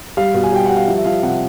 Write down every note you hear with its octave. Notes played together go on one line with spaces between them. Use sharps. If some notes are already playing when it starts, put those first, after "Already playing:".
G3 F5
B2
G#5
G3 G5
G3 F#5
F5
F3 E5
E5
F3 F5
C3 F#5